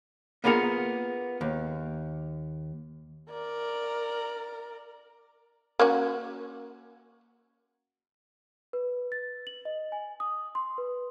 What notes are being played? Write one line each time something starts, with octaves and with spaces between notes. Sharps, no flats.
A#3 B3 F4 G#4 A#4 F#5
D#2
A#4 D5
A#3 C#4 F#4
B4
A6
F#7
D#5
G#5
D#6
C6
B4